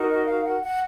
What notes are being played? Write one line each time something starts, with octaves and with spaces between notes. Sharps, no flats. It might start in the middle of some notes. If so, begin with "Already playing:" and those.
Already playing: D#4 F#4 A#4
D#5
F5
F#5
F#5